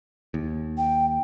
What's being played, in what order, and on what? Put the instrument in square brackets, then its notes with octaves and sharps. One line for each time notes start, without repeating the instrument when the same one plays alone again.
[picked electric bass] D#2
[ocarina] G5